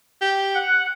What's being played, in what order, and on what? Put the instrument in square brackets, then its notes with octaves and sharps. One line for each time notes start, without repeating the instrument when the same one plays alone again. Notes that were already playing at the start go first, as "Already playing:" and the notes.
[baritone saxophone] G4
[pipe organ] F#5